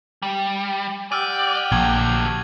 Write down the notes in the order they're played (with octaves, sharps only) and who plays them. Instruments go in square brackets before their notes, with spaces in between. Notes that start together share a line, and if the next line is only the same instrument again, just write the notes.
[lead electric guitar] G3
[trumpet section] G4 F#5 G5 [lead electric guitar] D5 [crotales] E6 F6 D#7
[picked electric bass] A#1 [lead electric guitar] D3 F#3 [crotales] G#6